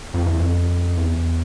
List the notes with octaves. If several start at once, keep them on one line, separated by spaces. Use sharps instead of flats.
F2
E2
F2
E2